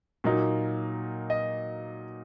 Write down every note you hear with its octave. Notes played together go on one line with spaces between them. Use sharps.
A#2 F#3 A#3 D#4
D#5